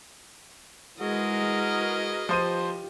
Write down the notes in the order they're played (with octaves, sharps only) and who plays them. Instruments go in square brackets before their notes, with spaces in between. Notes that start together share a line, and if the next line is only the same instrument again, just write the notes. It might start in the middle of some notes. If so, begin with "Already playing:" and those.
[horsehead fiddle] G#3 E4 [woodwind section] F#4 G#4 A#4 [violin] B4 D#5
[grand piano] F3 C5 D#7 [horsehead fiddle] F4 G4